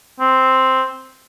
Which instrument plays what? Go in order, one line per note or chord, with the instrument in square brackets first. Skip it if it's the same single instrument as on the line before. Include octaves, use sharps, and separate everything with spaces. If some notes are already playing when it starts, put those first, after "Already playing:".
[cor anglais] C4